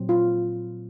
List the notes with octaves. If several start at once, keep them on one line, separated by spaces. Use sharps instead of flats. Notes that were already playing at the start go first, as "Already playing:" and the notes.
Already playing: A#2 F#3 C4
F4